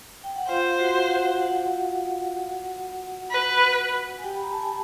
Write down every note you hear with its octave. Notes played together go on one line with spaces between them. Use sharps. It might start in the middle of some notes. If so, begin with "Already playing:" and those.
G5
F#5
F4 C5 F5
F#4 F#5
F5
F#4 F#5
F#4 F#5
B4
G#5
G4 G5
B5
A#5
A5
G#5